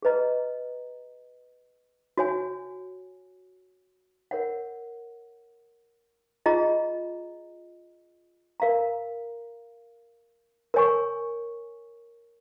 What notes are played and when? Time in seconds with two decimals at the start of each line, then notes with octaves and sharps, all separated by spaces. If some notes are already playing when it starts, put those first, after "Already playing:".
0.02 G#4 B4 D#5 A#5
2.18 F#4 C#5 G#5
4.31 A#4 C#5 F#5
6.46 F4 G#4 D#5 A#5
8.60 A#4 F5 A#5
10.74 A#4 C#5 G#5 C#6